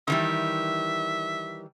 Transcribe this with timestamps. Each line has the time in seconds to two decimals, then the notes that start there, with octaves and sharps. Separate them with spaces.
0.08 D#3 E3 G3 E5